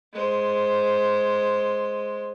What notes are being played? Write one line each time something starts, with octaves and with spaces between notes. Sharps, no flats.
G#3 C5